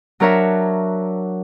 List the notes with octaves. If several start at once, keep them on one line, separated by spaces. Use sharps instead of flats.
F#3 D4 A#4 C#5 E5